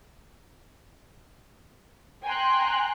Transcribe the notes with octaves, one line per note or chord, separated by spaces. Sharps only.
G5 G#5 A#5 C6 F#6